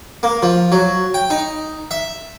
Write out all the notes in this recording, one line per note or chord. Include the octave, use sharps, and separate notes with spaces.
A#3
F3
F#3
G5
D#4
E5